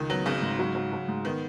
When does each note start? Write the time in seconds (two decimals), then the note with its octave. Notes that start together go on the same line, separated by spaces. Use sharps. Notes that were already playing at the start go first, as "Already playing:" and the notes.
Already playing: C#2 D#3
0.10 F#3 B3
0.26 G#1 C#3
0.42 G#2
0.59 F#3
0.75 F#3
0.93 F#3
1.08 G#2
1.25 D#3 B3